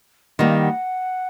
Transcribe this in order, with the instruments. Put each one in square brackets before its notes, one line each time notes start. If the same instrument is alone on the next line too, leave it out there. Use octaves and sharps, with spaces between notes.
[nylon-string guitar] D#3 G3 A#3 [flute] F#5
[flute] F5
F#5